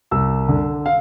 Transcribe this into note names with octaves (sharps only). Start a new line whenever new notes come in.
C2 E6
D3
F5